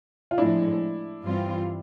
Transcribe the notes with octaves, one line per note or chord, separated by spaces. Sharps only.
F4
A2 F3 G#3 D4 E4
G2 E3 G3 C4 F4